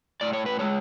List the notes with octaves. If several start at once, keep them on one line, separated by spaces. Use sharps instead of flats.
A2 D5
C#5
B4
G#3 C#5